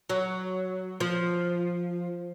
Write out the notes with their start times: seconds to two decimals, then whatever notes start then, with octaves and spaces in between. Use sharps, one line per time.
0.09 F#3
1.00 F3